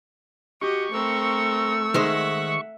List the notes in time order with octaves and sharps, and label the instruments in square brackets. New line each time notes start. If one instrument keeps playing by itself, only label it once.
[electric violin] F#4 G4 [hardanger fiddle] D#5 [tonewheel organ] C#6
[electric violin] A3 E6 [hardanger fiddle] C4 A#4
[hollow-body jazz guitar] D#3 G#3 C5 [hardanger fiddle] E5 F#5